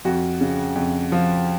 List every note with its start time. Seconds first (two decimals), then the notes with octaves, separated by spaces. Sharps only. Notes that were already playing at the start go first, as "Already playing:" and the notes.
0.05 F2 F#4
0.41 C#3
0.76 F2
1.12 F3